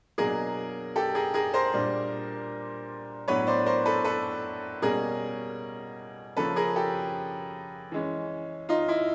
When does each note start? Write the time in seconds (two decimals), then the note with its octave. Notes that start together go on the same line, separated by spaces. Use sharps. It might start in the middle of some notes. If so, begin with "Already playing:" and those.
0.18 B2 F#3 A#3 D4 G#4 A#4
0.96 G4 A4
1.15 G#4 A#4
1.34 G#4 A#4
1.54 A#4 C5
1.73 A#2 G3 A#3 D4
3.28 A2 F#3 B3 D4 B4 C#5
3.47 C5 D5
3.66 A#4 C5
3.86 A4 B4
4.05 A4 B4
4.82 B2 G3 A#3 C#4 G#4 A#4
6.37 C#3 F3 A#3 C#4 A4 B4
6.56 G#4 A#4
6.76 G4 A4
7.92 E3 G#3 C#4
8.69 D#4 F4
8.88 E4